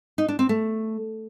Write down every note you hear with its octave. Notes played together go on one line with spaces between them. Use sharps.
D#4
D4
C4
A3